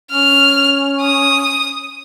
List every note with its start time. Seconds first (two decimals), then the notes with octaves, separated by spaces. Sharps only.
0.12 C#4 F6
1.01 D#6